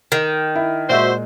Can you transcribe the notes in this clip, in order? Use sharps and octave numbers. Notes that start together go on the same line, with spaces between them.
D#3
E4
A#2 G#3 F#4 C5 E5